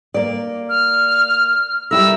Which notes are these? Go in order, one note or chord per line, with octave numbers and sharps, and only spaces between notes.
A#3 D5
F6
G3 E4 A#4 E6